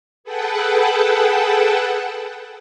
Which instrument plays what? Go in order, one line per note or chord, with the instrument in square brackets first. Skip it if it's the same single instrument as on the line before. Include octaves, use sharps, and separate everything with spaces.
[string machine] G#4 A4 B4 F#5 G5 A5